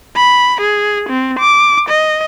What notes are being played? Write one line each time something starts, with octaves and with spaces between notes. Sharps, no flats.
B5
G#4
C4
D6
D#5